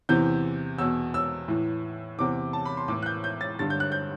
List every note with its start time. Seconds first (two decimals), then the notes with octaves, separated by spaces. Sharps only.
0.09 E2 C3 E3 G6
0.78 E2 B2 E6
1.14 E6
1.48 A2 E3
2.18 E2 C3 E3 D6
2.53 A5
2.66 B5
2.77 C6
2.88 A2 E3 D6
3.02 F#6
3.06 G6
3.24 G6
3.41 A6
3.59 G2 D3 A6
3.70 G6
3.80 F#6
3.92 G6